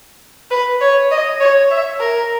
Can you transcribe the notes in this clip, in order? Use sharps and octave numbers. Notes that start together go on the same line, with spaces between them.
B4
C#5
D#5
C#5
E5
A#4